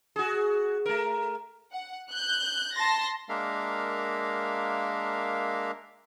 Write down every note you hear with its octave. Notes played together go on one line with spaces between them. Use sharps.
F#4 G#4
A3 A#4
F#5
F#6 G6
A5 C6 A6 A#6
G#3 A#3 D4 A#4 E5 F5